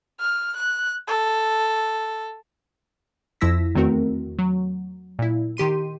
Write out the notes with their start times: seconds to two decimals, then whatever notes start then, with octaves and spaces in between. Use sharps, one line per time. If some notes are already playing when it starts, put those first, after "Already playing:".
0.20 F6
0.56 F#6
1.07 A4
3.41 F2 F3 E4 E6 A#6 B6
3.75 E2 D#3 A3 C4 F#4 A#4
4.39 F#3
5.19 A#2 E4
5.57 D#3 G4 C6 D#7